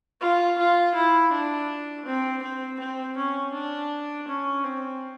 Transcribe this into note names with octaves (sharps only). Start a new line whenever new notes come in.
F4
F4
E4
D4
C4
C4
C4
C#4
D4
C#4
C4